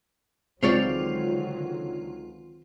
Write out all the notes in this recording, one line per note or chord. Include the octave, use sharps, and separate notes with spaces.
C#2 D3 D#3 F#3 C4 F4 C#5 D5